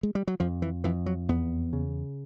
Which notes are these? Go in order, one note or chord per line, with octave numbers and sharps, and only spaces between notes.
G#3
G3
F#3
F2 F3
E3
F2 E3
F#3
E2 B3
C#3